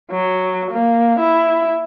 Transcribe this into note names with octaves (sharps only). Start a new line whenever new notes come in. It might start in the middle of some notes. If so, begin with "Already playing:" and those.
F#3
A#3
E4